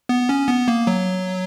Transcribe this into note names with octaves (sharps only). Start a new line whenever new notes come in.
B3
C#4
B3
A#3
F#3